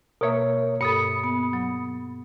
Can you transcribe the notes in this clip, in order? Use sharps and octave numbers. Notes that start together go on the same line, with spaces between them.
B2 A#3 A#4 C#5 E5
G2 A4 B5 D#6 C#7
B3
F#3